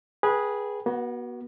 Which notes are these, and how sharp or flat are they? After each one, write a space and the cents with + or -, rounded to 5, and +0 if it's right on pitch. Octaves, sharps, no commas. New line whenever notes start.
G#4 +0 B4 -20 G5 -15
B3 -35 F#4 +10